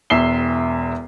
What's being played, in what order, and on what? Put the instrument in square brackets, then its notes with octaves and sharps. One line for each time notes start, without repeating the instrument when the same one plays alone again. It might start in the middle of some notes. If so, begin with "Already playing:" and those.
[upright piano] E1 E2 E5 C7 G7